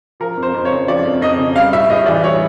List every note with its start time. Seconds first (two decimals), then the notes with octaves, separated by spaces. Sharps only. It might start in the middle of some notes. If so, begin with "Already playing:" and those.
0.20 F3 A#4
0.37 F2
0.43 C5
0.54 F2
0.65 C#5
0.71 C#3
0.88 F3 D5
1.05 F2
1.21 F2 D#5
1.38 C#3
1.56 G3 F5
1.72 A2 E5
1.90 A2 D#5
2.06 E3 D5
2.23 G3 C#5